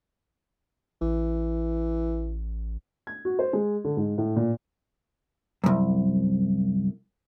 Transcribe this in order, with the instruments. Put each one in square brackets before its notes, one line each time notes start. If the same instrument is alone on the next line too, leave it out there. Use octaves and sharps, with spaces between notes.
[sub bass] A1 [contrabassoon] E3
[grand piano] G#6
F#4
C5
G#3
D3
G#2
A2
A#2
[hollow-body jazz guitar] C2 F#2